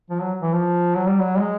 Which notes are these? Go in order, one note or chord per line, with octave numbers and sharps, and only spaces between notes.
F3
F#3
E3
F3
F#3
G3
F#3
G#3